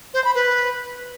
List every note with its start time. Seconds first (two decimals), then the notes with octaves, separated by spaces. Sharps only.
0.14 C5
0.24 B5
0.35 B4